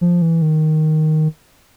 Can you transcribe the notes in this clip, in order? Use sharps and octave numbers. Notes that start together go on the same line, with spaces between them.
F3
E3
D#3